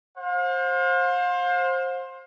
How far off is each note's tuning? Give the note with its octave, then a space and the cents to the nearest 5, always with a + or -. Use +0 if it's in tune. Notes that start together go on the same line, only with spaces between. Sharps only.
C5 +20 F5 +40